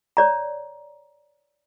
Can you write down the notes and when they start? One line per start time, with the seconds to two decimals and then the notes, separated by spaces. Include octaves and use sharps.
0.17 C#5 D5 A#5